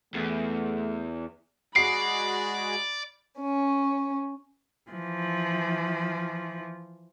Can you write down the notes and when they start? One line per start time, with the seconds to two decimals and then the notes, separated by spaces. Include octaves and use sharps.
0.14 E2 A3
1.76 G#3 F#4 G#4 D5 B5 C7
3.40 C#4
4.91 E3 F3